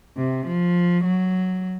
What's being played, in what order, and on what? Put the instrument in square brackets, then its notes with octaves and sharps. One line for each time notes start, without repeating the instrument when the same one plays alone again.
[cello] C3
F3
F#3